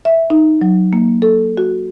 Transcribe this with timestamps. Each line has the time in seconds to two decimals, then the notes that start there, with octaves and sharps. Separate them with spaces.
0.05 E5
0.30 D#4
0.61 F#3
0.93 A#3
1.22 A4
1.57 F#4